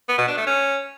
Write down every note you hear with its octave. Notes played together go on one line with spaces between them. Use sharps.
B3
B2
D4
A3
C#4